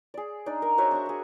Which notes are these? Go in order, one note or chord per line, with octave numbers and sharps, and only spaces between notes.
G#4 D5
D4 D#4 D5
A#4
F#4 C5 C#5 E5
D4 A#5 C#6
G#4 C#6